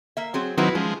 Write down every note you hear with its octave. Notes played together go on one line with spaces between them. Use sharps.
A#3 E5
F#3 C4 G#4
D#3 F#3 C4 E4 F#4 B4
F3 G#3 C#4